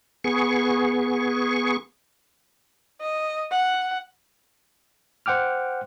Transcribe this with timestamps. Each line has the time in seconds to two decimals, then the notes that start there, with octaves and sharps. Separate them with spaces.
0.24 B3 G#4 C#6
3.01 D#5
3.52 F#5
5.26 C5 F#5 G5 D6 F6